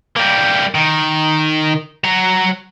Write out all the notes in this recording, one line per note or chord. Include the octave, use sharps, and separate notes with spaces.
G3 A#3
D#3
F#3 A#5